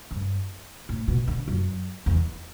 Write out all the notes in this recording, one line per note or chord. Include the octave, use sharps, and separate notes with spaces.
G2
A2
B2
D3
F#2
E2